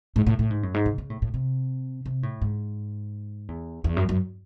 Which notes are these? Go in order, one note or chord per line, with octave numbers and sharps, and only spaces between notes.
G#2
A2
A2
G#2
F#2
G#2
C#3
C#3
A2
A2
C3
C3
A2
G#2
E2
E2
F#2
F#2